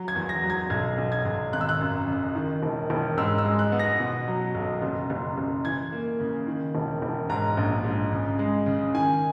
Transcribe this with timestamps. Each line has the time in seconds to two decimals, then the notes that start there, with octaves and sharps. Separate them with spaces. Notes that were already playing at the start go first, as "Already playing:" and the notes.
Already playing: F#3
0.08 G#6
0.16 E2
0.29 A#6
0.43 F#3
0.50 G#6
0.70 B1 G#6
0.98 B1
1.12 G#6
1.25 B1
1.53 G#1 F#6
1.61 E6
1.69 F#6
1.80 F#2
2.08 C#3
2.35 D#3
2.63 E1
2.90 E1
3.17 G#2 E6
3.38 E6
3.45 G#3
3.59 F#6
3.72 B3
3.79 A#6
4.00 B2
4.28 F#3
4.55 B1
4.82 F#1
5.10 F#1
5.38 F#1
5.65 E3 G#6
5.92 A#3
6.20 C#3
6.47 D#3
6.75 E1
7.02 E1
7.29 G#2 A#5
7.57 A#1
7.85 G#2
8.12 C#3
8.39 G#3
8.66 C#3
8.94 D#3 G#5